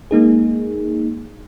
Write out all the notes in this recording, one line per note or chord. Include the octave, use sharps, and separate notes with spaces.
G#3 A#3 D#4 G#4